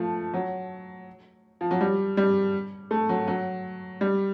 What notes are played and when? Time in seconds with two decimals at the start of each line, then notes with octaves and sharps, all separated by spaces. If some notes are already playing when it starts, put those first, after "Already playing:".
Already playing: F3 A3
0.33 F#3
1.61 F3
1.71 F#3
1.81 G3
2.17 G3
2.91 A3
3.09 F#3
3.28 F#3
4.01 G3